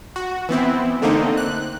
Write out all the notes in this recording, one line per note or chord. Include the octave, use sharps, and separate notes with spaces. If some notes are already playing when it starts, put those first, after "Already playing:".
F#4
E3 B3 C4 E4
D3 A3 A#3 C4 D#4
F#6